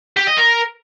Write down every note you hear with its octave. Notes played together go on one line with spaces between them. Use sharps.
G4
D#5
A#4